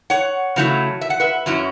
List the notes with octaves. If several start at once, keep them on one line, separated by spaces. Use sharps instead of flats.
C#5 F#5
C#3 F#3 A3 E4
E5
F#5
B4 E5
F#2 F#3 C#4 E4